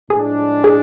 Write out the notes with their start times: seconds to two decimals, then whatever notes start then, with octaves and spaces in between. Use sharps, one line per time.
0.10 A2 F3 G#3 D4 G#4
0.64 G#4